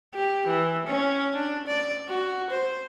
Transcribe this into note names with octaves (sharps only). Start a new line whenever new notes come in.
G4
E3
C#4
D4
D5
F#4
C5